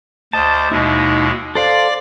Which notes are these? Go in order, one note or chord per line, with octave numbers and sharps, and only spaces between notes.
D2 C5 D#5 A5
D#2 B2 G#3 D#4 E4
A4 C5 D5 F5 D6